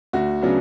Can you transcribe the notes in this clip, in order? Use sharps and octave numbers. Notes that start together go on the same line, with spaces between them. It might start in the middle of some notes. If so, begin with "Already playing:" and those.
D2 F#4
C#3 F#3 B3 D4